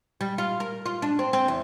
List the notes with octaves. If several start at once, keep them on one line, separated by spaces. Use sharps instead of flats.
G3
F4
A#4
F4
D4
C4
C4
E2